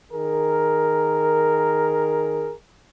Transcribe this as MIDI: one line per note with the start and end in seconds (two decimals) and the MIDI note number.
0.12 2.52 51
0.12 2.52 68
0.12 2.52 70